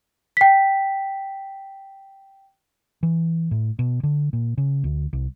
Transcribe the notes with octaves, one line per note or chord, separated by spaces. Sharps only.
G5 B6
E3
A2
B2
D3
A#2
C#3
D2
C2